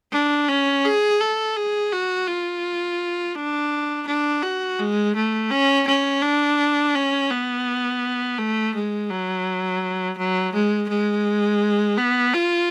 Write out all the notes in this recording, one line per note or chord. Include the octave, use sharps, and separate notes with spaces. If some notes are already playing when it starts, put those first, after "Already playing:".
D4
C#4
G#4
A4
G#4
F#4
F4
D4
D4
F#4
G#3
A3
C#4
C#4
D4
C#4
B3
A3
G#3
F#3
F#3
G#3
G#3
B3
F4